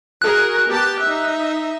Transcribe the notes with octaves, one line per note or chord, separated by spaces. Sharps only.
F#4 G#4 A#4 F#6
B3 G4 A5
D#4 E5